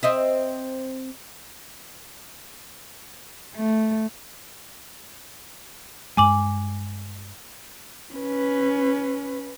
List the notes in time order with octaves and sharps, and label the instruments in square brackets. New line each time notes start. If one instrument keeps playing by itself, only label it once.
[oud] C4 D#5 E5
[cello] A3
[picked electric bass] G2 G#3 [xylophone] G#5 D6 F#7
[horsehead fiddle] C#4 B4